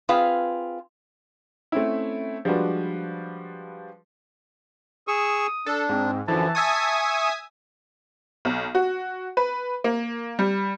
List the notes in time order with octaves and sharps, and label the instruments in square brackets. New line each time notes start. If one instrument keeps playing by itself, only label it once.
[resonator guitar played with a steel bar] C4 F4 G#4 B4 F5
[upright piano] A3 C4 C#4 E4
F3 G3 G#3 D4 F#4 B4
[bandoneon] G#4 C#6 E6 [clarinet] D#6
[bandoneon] D4 [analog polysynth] A4
[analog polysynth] G#2 [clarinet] C4
[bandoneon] F#2 D3 F3 [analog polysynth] E3 [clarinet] A5
[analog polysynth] E5 G#5 D#6 [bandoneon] C#6
[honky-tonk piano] B1
F#4
B4
A#3
G3